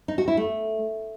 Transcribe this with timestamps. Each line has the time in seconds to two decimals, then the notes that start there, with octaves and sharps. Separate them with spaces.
0.08 D#4
0.18 F#4
0.28 E4
0.37 A3